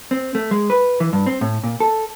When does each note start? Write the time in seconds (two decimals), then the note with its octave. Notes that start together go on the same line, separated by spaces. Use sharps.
0.11 C4
0.35 A3
0.51 G#3
0.70 B4
1.00 E3
1.13 G2
1.26 C4
1.41 A2
1.63 A#2
1.80 A4